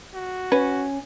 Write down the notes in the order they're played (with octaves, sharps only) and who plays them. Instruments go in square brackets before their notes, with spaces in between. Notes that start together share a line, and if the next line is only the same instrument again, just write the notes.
[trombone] F#4
[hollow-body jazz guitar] C#4 [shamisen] B4